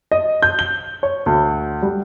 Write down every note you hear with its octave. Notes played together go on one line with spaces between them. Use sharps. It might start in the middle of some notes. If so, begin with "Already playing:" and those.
D#5
G6
G7
C#5
D2
G3